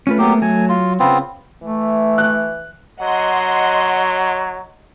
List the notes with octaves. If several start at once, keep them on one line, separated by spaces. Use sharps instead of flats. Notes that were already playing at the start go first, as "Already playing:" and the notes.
A3 C#4 F4 B4
F#3 A#3 B3 G4
F#3 G#5
F4
C#3 B3 C4 F4
E3 A3
F#6
F#3 D#5 F#5 C6